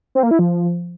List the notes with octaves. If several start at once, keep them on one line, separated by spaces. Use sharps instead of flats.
C4
A#3
E4
F3